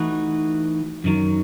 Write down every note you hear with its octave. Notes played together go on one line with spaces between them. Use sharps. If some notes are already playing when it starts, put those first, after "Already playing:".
Already playing: E3 A3 D#4 F#4 B4
F#2 D#3 F#3